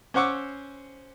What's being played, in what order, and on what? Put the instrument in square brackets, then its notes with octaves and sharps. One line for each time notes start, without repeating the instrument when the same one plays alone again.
[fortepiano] C#4 C5 F#5 C#6 D6 E6